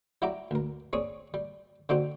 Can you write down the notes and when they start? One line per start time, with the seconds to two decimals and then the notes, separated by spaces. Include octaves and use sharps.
0.22 F#3 G3 E4 F#4 G4 A#5
0.51 D2 A#4
0.93 C4 D4 G#4 C#5 C#6 D#6
1.34 G3
1.89 D3 D4 D#4 F#4 G4 C5